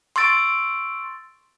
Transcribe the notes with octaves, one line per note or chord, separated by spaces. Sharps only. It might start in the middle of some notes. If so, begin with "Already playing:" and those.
C6 C#6 E6 A6 D7